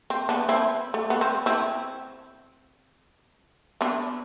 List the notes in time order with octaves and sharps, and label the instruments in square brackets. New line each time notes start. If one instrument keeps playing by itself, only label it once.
[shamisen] C4
B3 D4
C4 E4
A3
B3
C4
C4 E4
B3 D4